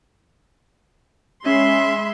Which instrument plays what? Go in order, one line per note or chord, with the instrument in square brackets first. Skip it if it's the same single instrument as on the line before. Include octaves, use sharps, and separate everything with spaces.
[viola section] G#3 B5 C6 [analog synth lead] C#4 [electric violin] E5